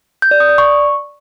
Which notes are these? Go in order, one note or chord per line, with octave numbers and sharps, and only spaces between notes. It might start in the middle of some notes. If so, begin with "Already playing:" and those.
G6
D5
D#6
D5
C#6